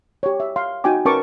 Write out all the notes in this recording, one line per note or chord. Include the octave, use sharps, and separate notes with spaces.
G4 C#5
E5
F5 C6
D#4 F#4 G5 G#5 D6
C#4 A#4 B4 A5 C#6 D6